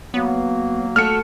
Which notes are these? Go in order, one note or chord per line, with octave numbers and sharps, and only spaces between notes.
F#3 A#3 B3
A3 F#4 A4 F6 C#7